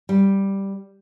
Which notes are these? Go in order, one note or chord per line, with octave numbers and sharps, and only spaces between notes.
G3